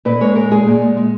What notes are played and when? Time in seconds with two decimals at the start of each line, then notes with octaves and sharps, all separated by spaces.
0.05 A#2 B4
0.21 G#3 C#5
0.36 G#3 A#4
0.51 A#2 G#4
0.67 A#2
0.82 G#3
0.97 G#3